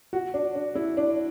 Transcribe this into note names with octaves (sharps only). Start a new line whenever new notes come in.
F#4
D4
D4
E4
D4